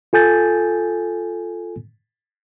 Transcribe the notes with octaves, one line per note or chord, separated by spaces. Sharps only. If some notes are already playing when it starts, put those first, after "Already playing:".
F4 A4 G#5 G6 A6